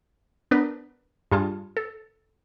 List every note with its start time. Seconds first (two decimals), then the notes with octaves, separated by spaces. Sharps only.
0.51 B3 D4 A#4 B4
1.31 G2 G3 F4 G#4 A5
1.77 A4